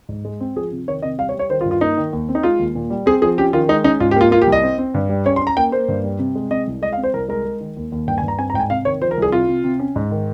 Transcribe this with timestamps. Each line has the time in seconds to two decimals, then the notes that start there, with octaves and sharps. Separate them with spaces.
0.09 G#2
0.25 G#3
0.40 C4
0.56 F3 G#4
0.72 C3
0.88 D#3 C#5
1.02 C3 D#5
1.18 G3 F5
1.29 C#5
1.34 G3
1.39 C#5
1.50 D#3 C5
1.61 F4
1.65 G2
1.71 F4
1.81 A#3 D#4
1.97 D#3
2.13 D#2
2.29 C4
2.35 D#4
2.43 G#3 F4
2.59 D#2
2.75 A#2
2.90 G3
3.06 C4 G#4
3.22 F3 G#4
3.38 C#4 G4
3.53 D#3 F4
3.69 G#3 D#4
3.84 C#4 D#4
4.00 G#2 F4
4.11 G4
4.16 A#3 F4
4.31 A#3 F4
4.42 G4
4.47 C2
4.52 D#5
4.63 C4
4.78 C4
4.94 G2
5.09 G3
5.26 C#4 C#5
5.36 C6
5.41 C#4
5.47 A#5
5.57 A#3 G5
5.72 A#3 C5
5.88 G2
6.04 G3
6.19 C3
6.35 G#3
6.51 C3 D#5
6.67 C2
6.82 G#3 D#5
6.92 F5
6.97 C4
7.04 C5
7.14 C2 A#4
7.29 G#3 A#4
7.45 G#3
7.61 D#3
7.77 D#2
7.92 D#2
8.07 G2 G5
8.18 G#5
8.23 G2
8.28 A#5
8.38 C4 G#5
8.50 A#5
8.54 G#2 G5
8.60 G#5
8.70 C3 F5
8.85 D#3 C#5
9.01 F3 C5
9.11 A#4
9.17 C2 G#4
9.32 C3 F4
9.48 C3
9.64 C3
9.79 C#4
9.96 G#2
10.11 D#3